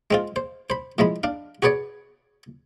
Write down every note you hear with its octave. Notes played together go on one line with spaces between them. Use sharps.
G#3 C4 F4
C5
C5 B5
A2 F3 G#3 B5
D4 F5
F#4 G#4 B4 C#5 D5